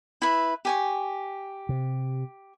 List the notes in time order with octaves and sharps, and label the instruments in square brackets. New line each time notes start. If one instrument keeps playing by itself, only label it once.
[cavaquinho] E4 B4 E5
G4 G#5 C#6
[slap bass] C3